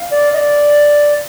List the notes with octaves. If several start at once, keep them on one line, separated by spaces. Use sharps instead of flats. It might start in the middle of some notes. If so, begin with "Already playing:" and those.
Already playing: F5
D5
D#5
D5